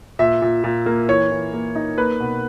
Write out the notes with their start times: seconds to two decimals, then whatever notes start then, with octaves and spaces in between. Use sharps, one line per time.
0.19 A#2 E5
0.42 A#2
0.64 A#2
0.86 A#3
1.08 E3 C#5
1.31 E3
1.53 A#3
1.75 D#4
1.98 A#3 B4
2.20 B2